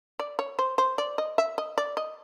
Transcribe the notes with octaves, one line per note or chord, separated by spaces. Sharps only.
D5
C#5
C5
C5
D5
D#5
E5
D#5
D5
D#5